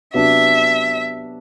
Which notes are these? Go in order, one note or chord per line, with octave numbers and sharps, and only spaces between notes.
C3 F#3 B3 D4 E5